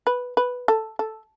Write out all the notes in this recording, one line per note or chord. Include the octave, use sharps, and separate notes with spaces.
B4
B4
A4
A4